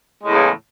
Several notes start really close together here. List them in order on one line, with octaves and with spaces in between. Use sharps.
G#3 A2 E2 C#3